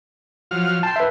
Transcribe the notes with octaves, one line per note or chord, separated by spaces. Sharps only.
F3 F#3 F6
G5 A5 C6
B4 E5